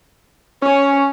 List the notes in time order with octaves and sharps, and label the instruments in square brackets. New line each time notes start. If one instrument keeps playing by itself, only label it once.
[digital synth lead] C#4 [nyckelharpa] C#5